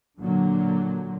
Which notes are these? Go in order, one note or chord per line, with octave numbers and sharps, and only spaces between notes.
A#2 D3 F#3